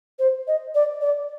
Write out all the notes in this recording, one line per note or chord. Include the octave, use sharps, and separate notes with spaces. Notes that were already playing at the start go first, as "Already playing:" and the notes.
C5
D#5
D5
D5